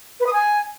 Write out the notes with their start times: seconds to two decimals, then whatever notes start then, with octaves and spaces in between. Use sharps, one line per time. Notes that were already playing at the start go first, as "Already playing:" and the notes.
0.20 B4
0.27 D#6
0.33 G#5